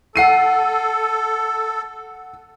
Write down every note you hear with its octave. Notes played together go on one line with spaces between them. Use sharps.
A4 F#5 C7 D#7